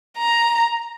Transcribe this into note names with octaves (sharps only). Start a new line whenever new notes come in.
A#5